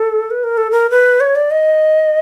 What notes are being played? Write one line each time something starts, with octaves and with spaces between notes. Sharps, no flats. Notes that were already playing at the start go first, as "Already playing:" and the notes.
Already playing: A4
B4
A#4
A4
A#4
B4
C#5
D5
D#5